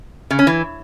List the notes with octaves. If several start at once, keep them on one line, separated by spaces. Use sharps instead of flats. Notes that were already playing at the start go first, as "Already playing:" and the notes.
C#3
C#4
E3